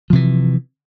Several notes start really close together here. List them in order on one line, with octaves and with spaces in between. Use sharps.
F3 C3 E3